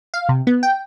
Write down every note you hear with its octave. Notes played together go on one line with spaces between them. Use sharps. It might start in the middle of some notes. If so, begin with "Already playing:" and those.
F5
C3
B3
G5